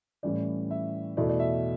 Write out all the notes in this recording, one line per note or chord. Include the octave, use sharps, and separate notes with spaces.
A2 E3 G3 C#4 E4 D5
E5
E2 B2 A3 E4 D5
D5
E5